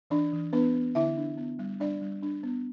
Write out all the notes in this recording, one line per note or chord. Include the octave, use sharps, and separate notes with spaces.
E3 D4 D5
E3
B3 D4 B4
B3
D3 E4 E5
D4
B3
G3
G3 D4 D5
G3
D4
B3